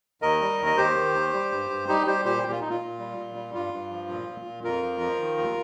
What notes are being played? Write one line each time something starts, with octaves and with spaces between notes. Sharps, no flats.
D#2 A#4 D#5
G3
D#2
D#5
D#2 G4 C5
D#3
D#2
G3
G2
G2
G3 D#4 G4
G3 G4 C5
A#2 G4 C5
A#2 G4
F4
A#2 D#4
F4
A#2
G3
A#2
G3
G2 F4
G2
F3
A#2
A#2
A#2
F2 F4 A#4
F3
F3
D#3
D#2